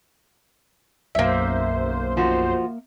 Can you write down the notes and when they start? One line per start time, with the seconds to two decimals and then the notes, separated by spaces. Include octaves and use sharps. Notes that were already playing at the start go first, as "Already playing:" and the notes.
1.15 B1 F#2 A#3 C5 E5
2.17 F3 F#4